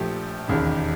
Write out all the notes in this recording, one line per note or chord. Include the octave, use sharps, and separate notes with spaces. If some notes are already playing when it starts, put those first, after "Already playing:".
Already playing: A#1 A#2 F3 A3 G4
E1 D#2 C#3